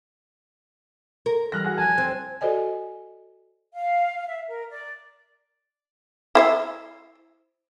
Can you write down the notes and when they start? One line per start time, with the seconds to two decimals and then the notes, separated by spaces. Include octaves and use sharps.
1.26 A#4
1.52 E3 G3 G#5 F6 F#6 A#6
1.64 F#4 G#4
1.78 F1 G#5 A5 F6
1.98 C4
2.41 F#4 A4 C5 D5 D#5 G#5
3.74 F5
4.28 E5
4.47 A#4
4.69 D5
6.35 E4 C5 E5